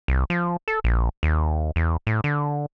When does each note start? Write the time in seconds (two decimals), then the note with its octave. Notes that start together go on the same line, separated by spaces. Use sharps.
0.08 C2
0.30 F3
0.68 A4
0.84 A#1
1.23 D#2
1.76 E2
2.07 A2
2.24 D3